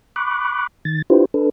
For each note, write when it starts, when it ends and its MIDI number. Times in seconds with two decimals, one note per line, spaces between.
0.16 0.67 83
0.16 0.67 85
0.16 0.67 86
0.16 0.67 90
0.85 1.02 51
0.85 1.02 93
1.10 1.25 62
1.10 1.25 64
1.10 1.25 65
1.10 1.25 67
1.10 1.25 71
1.10 1.25 72
1.34 1.50 62
1.34 1.50 69
1.34 1.50 71